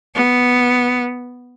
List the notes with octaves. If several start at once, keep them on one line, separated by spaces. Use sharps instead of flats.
B3